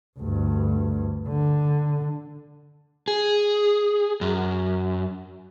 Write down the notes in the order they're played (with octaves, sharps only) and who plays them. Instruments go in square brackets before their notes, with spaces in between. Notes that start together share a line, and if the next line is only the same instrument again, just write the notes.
[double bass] D2 G2
D3
[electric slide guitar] G#4
F#2